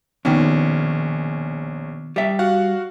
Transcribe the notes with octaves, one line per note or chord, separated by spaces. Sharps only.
A#1 B2 D#3 C#4
G3 E5
F#4 F5 F#5